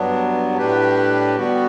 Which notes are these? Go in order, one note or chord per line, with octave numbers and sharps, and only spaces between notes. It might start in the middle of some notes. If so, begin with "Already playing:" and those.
Already playing: G2 F#3 B3 D4
A2 G3 D4 G4 B4
D3 G3 B3 F#4